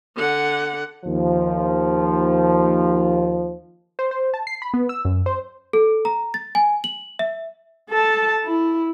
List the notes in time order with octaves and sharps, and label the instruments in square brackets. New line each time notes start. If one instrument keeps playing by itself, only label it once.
[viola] D3 F#5
[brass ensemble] D#2 F3
[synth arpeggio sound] C5
C5
A5
C7
B5
B3
E6
F#2
C5
[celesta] A4
A#5
A6
G#5
F#7
E5
[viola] A4 A5
E4